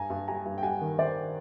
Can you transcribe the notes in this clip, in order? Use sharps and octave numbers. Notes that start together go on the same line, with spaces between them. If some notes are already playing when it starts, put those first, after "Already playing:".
Already playing: G2 G#5 A#5
G2
G3 G#5 A#5
G2
G5
G3 F#5 G#5
D#3
D#3 C5 D5